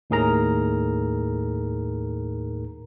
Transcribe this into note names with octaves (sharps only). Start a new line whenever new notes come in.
D#2 A2 D#4 G#4 A#4 A#5